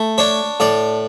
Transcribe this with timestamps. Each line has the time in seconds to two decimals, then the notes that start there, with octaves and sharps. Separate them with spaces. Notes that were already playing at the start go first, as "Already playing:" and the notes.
Already playing: A3
0.18 D4 C#5
0.60 A2 D5